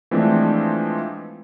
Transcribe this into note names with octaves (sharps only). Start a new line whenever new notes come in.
E3 F3 G#3 A3 C4 D4